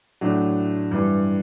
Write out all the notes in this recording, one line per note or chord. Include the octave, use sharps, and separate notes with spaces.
A2 F#3 A3 D4
G2 E3 G3